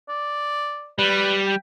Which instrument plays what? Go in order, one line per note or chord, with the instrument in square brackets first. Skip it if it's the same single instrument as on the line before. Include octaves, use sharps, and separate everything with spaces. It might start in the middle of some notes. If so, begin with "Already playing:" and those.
[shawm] D5
[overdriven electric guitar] G3 [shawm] B4
[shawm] G5